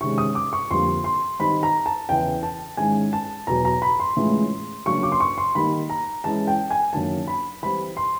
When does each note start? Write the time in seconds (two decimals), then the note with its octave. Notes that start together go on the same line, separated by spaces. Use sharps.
0.01 C3 D#3 G#3 C#4 C#6
0.18 D#6
0.35 D6
0.53 C#6
0.71 F2 D3 G3 A#3 C6
1.04 C6
1.39 D#3 G3 C4 D#4 B5
1.63 A#5
1.86 A5
2.09 E2 C#3 E3 G5
2.43 A5
2.77 G#2 D#3 G#3 C#4 E4 G#5
3.13 A5
3.47 E2 B2 F#3 A#5
3.65 A#5
3.82 B5
4.00 C6
4.16 A2 E3 G#3 C#4 F4
4.86 C#3 F#3 A#3 D4 C#6
5.03 D6
5.12 C6
5.20 C#6
5.38 C6
5.55 D#3 G3 A#3 D#4 B5
5.90 A#5
6.24 E3 G#3 C#4 E4 A5
6.47 G5
6.70 G#5
6.93 F#2 D#3 F#3 A#3 D4 A5
7.28 B5
7.62 E3 G3 C4 B5
7.97 C6